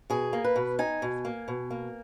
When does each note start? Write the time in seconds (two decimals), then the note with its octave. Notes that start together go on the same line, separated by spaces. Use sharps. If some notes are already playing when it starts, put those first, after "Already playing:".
0.10 B2 G#4
0.33 A#3
0.44 B4
0.56 B2
0.79 D#4 G#5
1.02 B2
1.25 A#3
1.48 B2
1.71 A#3